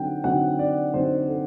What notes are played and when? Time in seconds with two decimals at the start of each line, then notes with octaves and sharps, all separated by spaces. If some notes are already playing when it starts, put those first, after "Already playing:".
Already playing: D3 F#3 C4 D#4 F#5 G5
0.24 D3 F#3 C4 D#4 F#5
0.59 D5
0.94 D3 F#3 C4 D#4 C5
1.28 A4